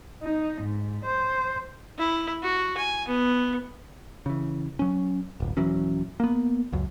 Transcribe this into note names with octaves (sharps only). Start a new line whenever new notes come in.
D#4
G#2
C5
E4
F#4
G#5
B3
C#3 E3
F#3 C#4
D1 G1
D#1 E3 F#3 C#4
A#3 B3
C#2 F#2